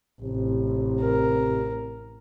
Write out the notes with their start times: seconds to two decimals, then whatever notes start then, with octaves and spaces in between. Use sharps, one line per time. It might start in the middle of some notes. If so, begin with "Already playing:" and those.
0.22 A1 C3
1.00 A#4